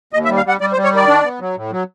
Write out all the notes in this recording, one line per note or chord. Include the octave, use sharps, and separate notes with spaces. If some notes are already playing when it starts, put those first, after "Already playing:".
D#2 D#5
E5
G3
F5
G3 F#5
G3 D5
C5
G3
C#5
D#3 D5
D4
B3
F#3
A2
F#3